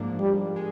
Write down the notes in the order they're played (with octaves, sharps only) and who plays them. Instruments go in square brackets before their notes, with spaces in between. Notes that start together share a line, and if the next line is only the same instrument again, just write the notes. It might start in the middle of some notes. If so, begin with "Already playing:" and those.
Already playing: [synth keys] G#2 F3 A#3 D4
[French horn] G3
[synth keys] G#3